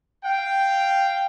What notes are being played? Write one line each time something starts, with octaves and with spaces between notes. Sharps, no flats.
F5 G5